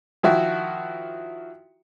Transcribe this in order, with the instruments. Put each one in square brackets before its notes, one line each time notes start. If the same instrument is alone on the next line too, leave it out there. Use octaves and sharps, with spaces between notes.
[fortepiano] D#3 F3 E4 F#4